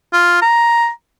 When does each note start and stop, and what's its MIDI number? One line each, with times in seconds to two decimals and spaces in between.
0.13 0.38 65
0.42 0.89 82